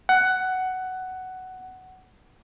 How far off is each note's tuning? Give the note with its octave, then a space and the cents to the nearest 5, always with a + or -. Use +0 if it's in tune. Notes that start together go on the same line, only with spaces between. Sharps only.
F#5 +10